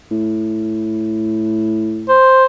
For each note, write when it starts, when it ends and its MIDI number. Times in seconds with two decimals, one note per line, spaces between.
0.11 2.18 45
2.09 2.45 72